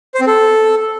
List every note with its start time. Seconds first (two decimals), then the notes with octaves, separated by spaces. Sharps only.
0.15 C5
0.21 C4
0.27 A4